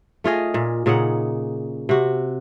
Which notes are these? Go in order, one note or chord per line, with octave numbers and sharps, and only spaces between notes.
A3 F4 G#4 D#5
A#2
A#2 C#3 D#4 F#5
C3 F#4